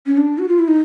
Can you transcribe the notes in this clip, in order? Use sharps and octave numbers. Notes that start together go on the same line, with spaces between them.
C#4
D4
F#4
F4
E4
D#4